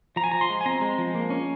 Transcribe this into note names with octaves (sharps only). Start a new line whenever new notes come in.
F3 A#5
G#5
F3 A#5
C6
G#3
G#5
C4 A#5
G#3
F3
A#3
C#4